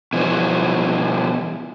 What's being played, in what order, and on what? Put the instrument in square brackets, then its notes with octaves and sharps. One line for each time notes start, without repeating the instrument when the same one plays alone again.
[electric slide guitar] B2 E3 F3 G3